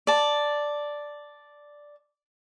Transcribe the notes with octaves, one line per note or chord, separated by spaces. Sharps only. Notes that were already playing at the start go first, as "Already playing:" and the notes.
D5 A5